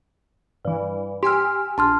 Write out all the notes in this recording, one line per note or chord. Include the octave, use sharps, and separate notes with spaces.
G2 E3
G4 G#5 C6 E6 F6
A#1 A5 C6 F6